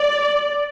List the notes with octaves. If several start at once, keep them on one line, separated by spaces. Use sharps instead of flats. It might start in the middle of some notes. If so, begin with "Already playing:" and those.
Already playing: D5